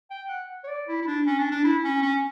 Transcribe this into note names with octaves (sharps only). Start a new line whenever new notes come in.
G5
F#5
C#5
D5
E4
E4
D4
C#4
D4
D4
E4
C#4
C#4